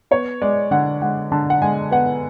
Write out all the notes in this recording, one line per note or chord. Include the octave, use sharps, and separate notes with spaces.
B3 C#5
G#3 D5
D3 F#5
G#3 F#5
D3 A5
F#5
G#3 G#5
B3 F#5